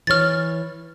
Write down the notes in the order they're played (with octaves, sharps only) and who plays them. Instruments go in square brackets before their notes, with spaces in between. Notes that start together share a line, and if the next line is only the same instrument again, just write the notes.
[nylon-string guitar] E3 C#5 [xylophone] F6 A6